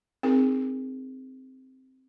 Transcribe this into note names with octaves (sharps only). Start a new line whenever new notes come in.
C4 D#4 G#4 A#4